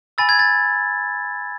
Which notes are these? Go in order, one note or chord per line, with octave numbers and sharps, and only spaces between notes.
G#5 B5 E6 A6
G#6
A6